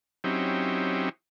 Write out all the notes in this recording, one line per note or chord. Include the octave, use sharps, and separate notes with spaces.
F#3 C4 C#4 D#4 E4 G4